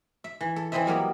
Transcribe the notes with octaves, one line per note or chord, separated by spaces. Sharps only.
E5
E3
A4
E3 C4 E4 C5 D#5 E5
F#3 G3 A#3 B3